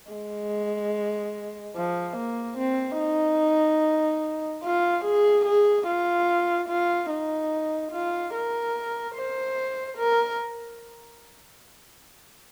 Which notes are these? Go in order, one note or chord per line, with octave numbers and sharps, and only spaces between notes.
G#3
F3
A#3
C4
D#4
F4
G#4
G#4
F4
F4
D#4
F4
A#4
C5
A#4